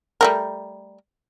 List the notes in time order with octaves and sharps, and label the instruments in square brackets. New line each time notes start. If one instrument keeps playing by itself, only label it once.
[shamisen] G3 A3 A#4